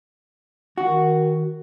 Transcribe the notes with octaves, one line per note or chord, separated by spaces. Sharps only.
D#3 F#4